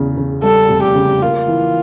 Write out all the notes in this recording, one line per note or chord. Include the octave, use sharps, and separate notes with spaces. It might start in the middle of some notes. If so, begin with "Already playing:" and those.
Already playing: E2 C#3
C#3
G3 A4
F1
G4
C#3
A#3 F4
E3